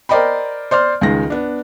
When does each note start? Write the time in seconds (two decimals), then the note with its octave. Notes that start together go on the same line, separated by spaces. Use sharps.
0.09 A#4 C5 D5 D#5 G5 B5
0.71 C5 D5 C6 F6
1.01 C#2 D#3 G#3 G#4 A#6
1.30 B3 D4